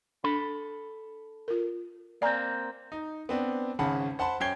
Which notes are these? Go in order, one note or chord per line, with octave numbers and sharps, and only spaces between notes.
D4 A4 B5
F4 A#4
A#3 C4 D5 G#5 A#5
D#4
B3 C4 D4
G#1 C#3 C#4 F#5 A5 B5
C5 F#5 A5 B5 C6
F#2 C#5 G5 G#6 C7 G7